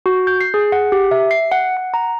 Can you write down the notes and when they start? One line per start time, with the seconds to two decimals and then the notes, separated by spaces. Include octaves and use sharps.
0.06 F#4
0.27 G6
0.41 C7
0.54 G#4
0.72 F#5
0.92 G4
1.11 E5
1.31 C7
1.52 F#5
1.77 F#5
1.94 A#5